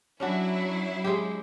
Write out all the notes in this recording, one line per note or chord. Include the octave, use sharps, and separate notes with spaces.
F#3 C#4 D4 E4 F#4
G#3 G4